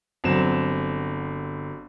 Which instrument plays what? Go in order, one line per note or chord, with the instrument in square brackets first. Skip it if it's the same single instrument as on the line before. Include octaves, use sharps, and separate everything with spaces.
[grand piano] G1 F#3 C4 E7